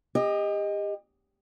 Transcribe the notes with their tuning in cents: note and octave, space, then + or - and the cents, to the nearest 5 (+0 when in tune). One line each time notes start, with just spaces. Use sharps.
G4 +35 D#5 +0